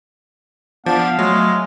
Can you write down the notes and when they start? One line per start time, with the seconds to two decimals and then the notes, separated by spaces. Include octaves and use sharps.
0.86 F3 B3 D4 F5
1.19 F#3 G#3 A3